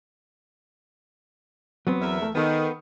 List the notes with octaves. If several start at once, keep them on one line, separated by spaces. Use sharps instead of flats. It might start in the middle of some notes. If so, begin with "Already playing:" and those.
F#3 B3 C4
E2 A#4 E5
A3
D#3 B3 A4